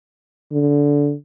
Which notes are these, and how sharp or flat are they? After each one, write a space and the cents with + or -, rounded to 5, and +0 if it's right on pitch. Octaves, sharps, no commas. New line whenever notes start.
D3 -20